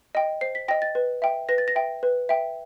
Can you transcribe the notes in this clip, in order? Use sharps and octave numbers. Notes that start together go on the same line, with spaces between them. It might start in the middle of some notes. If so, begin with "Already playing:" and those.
D#5 G5
C5 C7
B6
D#5 G5 A#6
A6
B4
E5 G5
B4 A#6
A6
A#6
E5 G5
B4
E5 G5